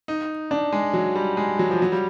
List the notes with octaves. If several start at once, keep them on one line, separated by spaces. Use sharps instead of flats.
D#4
D4
G#3
F#3
G3
G#3
F#3
F3
F#3
G3